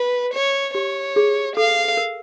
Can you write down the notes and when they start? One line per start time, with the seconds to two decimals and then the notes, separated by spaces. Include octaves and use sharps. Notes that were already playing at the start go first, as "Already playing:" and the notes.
Already playing: B4
0.33 C#5
0.75 G4 C#5
1.16 G#4
1.57 A4 F5
1.97 A#4